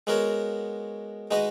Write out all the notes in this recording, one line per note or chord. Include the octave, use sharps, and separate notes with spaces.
G#3 B3 F#4 A#4 C#5
G#3 D#4 F#4 B4 D#5